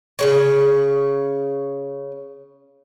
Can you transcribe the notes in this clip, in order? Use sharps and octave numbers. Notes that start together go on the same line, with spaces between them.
C#3 G#3 C#5